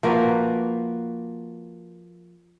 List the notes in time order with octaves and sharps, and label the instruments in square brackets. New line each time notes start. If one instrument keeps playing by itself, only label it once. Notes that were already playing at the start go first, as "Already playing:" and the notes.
[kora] F3 A#3 F#4 B4